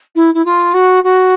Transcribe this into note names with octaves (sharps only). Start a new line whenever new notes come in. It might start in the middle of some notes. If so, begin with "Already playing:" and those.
E4
E4
F4
F#4
F#4